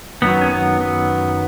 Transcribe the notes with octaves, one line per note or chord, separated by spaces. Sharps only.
F#2 D#3 F#3 B3
C#4
B3
B3